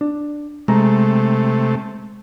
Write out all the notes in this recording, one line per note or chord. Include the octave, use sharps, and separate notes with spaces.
D4
C3 G#3 A3 A#5